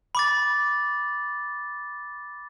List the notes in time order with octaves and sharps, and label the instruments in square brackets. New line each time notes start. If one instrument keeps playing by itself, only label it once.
[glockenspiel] B5 D6 A6